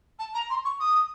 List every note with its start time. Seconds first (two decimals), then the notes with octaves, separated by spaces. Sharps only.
0.19 A5
0.34 A#5
0.50 C6
0.65 C#6
0.80 D#6